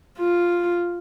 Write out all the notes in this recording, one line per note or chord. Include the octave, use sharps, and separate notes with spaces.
F4